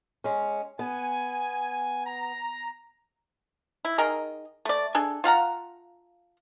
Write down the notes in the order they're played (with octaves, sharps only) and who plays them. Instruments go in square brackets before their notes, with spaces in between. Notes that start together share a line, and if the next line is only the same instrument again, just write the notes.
[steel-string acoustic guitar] G#3 C#4
[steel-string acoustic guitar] B3 [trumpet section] G#5
[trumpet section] A#5
[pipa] E4
D#3 G#4 A#4 D#5
A3 D5
D4 G#4 A4
F4 F5 F#5 A#5